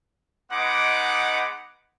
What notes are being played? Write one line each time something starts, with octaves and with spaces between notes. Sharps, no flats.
G#3 B3 D#4 F#5 D6